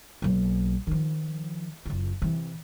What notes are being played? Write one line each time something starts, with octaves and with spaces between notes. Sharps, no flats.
B1 A#3
D#3 F3
F#1 F4
C3 E3